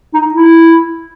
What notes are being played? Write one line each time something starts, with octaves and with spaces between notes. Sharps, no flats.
D#4
E4